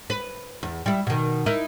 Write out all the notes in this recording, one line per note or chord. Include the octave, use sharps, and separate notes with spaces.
B4
E2
G3 E4
B2 D#3
D#4 E4 A#4